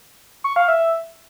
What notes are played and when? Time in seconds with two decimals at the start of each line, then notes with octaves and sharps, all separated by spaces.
0.44 C#6
0.56 F5
0.68 E5